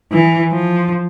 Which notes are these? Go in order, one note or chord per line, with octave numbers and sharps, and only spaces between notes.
E3
F3